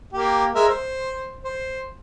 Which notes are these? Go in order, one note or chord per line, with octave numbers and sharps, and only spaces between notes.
A#3 G4
G#3 A#4 E5
C5
C5